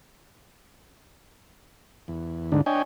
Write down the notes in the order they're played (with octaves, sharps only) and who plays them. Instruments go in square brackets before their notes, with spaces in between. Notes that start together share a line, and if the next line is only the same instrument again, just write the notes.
[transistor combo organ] E2
D2 G#2 D3 D4 D#4
D4 C#5 D#5 G5 G#5